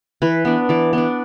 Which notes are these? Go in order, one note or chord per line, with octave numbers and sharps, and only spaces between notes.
E3 B4
B3 D4
E3 D5
B3 D4